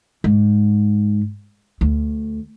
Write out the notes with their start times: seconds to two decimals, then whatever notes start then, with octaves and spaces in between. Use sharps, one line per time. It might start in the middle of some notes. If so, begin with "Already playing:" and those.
0.24 G#2
1.81 D2